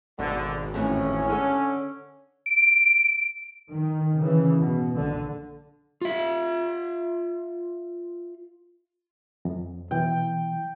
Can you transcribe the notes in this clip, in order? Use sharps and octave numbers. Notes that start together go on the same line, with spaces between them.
G#1 B2 D3
F2 A2 E3 C#4
D3 A4
D7
D#3
C#3 E3
B2
A#1 D3
F4 E5
F2
B2 E3 G5